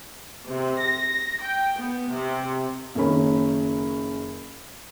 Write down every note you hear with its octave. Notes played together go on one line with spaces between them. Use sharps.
C3
A#6
G5
B3
C3
F#1 D#3 C#4 B5